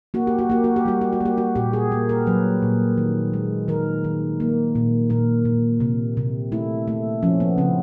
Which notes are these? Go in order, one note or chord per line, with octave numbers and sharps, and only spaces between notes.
A#3 F#4
G4
F#4
A#3 G4
F#4
G4
G3 F#4
G4
F#4
A#3 G4
F#4
A#2 G4
G#4
A#3
A#4
F#3 B4
A#2
D#3
G#3
D#3 A#4
D#3
A#3
A#2
A#2 A#4
A#2
C3
C3
A3 E4
A3
F3 C#4
B3
C#3 C4